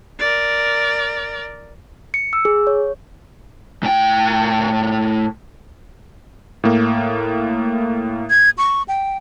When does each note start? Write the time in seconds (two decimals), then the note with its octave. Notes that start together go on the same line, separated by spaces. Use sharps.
0.19 A#4 D5
2.14 C#7
2.33 E6
2.45 G#4
2.67 C#5
3.83 A2 G5
6.64 A2 A#3
8.30 G#6
8.58 C#6
8.88 G5